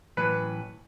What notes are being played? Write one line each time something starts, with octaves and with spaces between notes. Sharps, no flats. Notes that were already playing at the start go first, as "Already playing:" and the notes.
A2 E3 F#3 B4